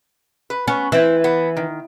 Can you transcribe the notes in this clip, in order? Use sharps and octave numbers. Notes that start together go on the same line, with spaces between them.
B4
B3 C#4
E3 C4 E5
B3
D#3